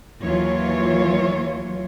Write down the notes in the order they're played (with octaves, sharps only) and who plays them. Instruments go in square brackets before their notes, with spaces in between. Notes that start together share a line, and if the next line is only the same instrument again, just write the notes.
[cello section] D#2 E3 F#3 F4 C#5